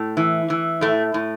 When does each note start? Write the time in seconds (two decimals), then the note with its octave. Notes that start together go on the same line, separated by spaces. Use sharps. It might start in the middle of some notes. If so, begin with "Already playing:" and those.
Already playing: A2
0.17 E3
0.50 E3
0.81 A2 A3
1.14 A2